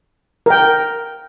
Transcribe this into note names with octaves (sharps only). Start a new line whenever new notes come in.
A#4 G5